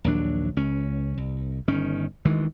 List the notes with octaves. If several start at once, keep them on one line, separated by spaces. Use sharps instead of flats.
A#1 D#2 F#3 D4
C#2 C#4
C2
G1 D#3 C#4
D2 D#3 E3 G#3